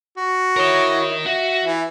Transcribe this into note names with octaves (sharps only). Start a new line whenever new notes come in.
F#4
E4 A#4 C#5 D#5
F#4 E5
E3